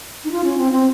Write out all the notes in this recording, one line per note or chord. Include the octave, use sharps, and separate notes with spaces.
D#4
F4
C#4
C4
C4